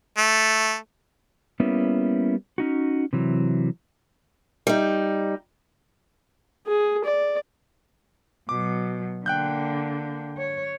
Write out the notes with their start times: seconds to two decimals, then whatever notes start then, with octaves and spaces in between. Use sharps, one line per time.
0.18 A3
1.60 G3 A#3 B3 C#4 E4
2.58 C#4 D#4 F#4
3.13 C3 E3 F#3
4.67 G3 D#4
6.67 G#4
7.04 D5
8.49 B2 F#3 D6
9.26 D3 A#3 G5 F#6 G6
10.37 C#5